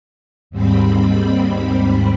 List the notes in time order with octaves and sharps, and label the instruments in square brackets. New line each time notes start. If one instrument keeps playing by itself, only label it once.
[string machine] D#2 G#2 G3 C4 B5